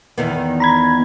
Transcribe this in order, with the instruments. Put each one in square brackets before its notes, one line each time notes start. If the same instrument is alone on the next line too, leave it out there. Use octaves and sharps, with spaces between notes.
[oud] E2 D#3 B3
[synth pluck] A#5 B5 G#6